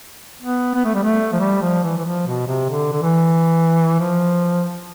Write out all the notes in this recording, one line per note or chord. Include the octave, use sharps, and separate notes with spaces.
B3
B3
A3
G3
A3
F3
G3
F3
E3
E3
F3
B2
C3
D3
D3
E3
F3